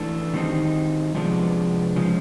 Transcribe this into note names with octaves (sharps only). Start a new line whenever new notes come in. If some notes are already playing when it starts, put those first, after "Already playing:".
Already playing: E3 A3 D4
D#3 G3 C4 D#4
C3 F3 G#3 B3 D4
C#3 F3 G#3